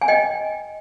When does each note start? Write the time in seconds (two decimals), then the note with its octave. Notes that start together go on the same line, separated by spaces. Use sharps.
0.01 G#5
0.08 D#5 G5